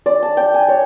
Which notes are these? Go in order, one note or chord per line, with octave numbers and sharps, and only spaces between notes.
D5
A5
G5
G#5
C#5